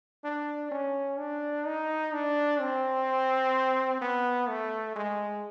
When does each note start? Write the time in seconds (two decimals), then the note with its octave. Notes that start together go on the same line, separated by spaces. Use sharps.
0.24 D4
0.71 C#4
1.19 D4
1.66 D#4
2.13 D4
2.60 C4
4.01 B3
4.49 A3
4.96 G#3